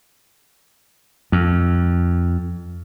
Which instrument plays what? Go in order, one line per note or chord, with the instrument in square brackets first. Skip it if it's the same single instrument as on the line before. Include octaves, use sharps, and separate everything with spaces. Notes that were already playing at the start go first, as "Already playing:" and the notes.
[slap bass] F2